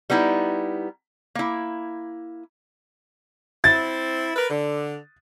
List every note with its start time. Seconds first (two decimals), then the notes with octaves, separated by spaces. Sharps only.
0.10 G3 B3 D#4 E4
1.35 A#3 E4
3.64 C4 E4 A6
4.36 A#4 B4
4.50 D3